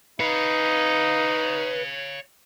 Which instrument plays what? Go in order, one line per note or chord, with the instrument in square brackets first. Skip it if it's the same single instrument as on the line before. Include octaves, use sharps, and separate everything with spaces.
[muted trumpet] D#4 [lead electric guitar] B4 [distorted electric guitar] C#5 F5